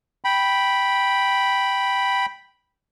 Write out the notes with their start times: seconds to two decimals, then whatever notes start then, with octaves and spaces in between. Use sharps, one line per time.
0.25 G5 B5